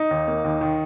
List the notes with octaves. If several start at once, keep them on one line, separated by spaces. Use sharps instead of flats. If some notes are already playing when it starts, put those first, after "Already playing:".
Already playing: D#4
D#2
A#3
D#2
D#3